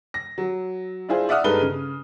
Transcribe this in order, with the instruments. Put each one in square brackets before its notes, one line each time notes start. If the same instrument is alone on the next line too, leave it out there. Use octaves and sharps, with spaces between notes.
[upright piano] A#6
F#3
D4 E4 F4 G#4 C5
D5 E5 F#5 D#6 F6
G2 G#3 D#4 A4 B4 G7
C#3